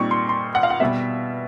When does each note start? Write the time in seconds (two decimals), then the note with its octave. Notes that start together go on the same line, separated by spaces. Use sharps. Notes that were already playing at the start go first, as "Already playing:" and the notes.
Already playing: A#2 G3 C4 D#4 C#6
0.11 C6
0.29 C6
0.55 F#5
0.63 F5
0.70 F#5
0.80 B2 G3 B3 E5